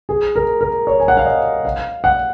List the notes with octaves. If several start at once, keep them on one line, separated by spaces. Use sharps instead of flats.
G#4
A#4
A#4
C#5
G#5
F#5
F5
D#5
F5
F#5